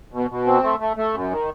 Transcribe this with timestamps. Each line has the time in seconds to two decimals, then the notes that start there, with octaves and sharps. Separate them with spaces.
0.13 B2
0.31 B2
0.46 C4
0.63 A3
0.80 A3
0.97 A3
1.14 F#2
1.31 D#3